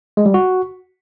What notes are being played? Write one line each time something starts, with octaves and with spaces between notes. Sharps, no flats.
G#3
G3
F#4